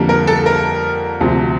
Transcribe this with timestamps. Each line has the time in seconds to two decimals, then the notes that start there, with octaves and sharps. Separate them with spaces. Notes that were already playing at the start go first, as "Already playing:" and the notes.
Already playing: F2 D3 G3 A#3
0.09 A#4
0.27 A4
0.46 A#4
1.21 D2 C3 F3